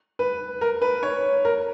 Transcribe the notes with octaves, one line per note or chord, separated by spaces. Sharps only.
B4
A#4
B4
C#5
A#4